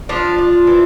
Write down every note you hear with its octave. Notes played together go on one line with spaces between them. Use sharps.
F3 D4 F4
D4
E3